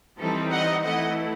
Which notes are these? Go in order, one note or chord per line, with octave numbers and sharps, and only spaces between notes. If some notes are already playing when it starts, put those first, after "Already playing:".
E3 G3 C4 D#4 A4
D#5 F#5
E3 A3 E4 D#5 F#5